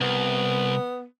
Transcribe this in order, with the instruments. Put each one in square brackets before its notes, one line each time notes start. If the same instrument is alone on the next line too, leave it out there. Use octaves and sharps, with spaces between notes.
[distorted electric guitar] C2 [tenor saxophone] B3